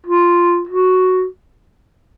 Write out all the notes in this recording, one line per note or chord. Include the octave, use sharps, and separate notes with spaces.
F4
F#4